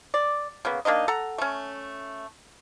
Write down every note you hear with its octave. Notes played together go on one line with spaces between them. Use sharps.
D5
C#3 A#3 B3
A#3 D4 D#4 D#5
A4 F#5 A#5
A3 C#4